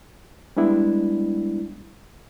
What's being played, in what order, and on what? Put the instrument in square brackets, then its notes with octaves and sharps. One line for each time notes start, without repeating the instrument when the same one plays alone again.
[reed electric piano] G3 G#3 B3 D4 E4